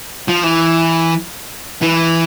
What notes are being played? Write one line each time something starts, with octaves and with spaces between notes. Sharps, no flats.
F3
E3
E3